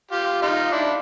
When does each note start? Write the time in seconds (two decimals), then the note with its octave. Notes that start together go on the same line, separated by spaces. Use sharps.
0.11 F4 G4
0.42 D#4 F4
0.72 D4 E4